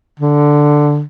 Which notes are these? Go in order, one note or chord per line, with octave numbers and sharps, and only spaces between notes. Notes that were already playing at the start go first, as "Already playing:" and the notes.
D3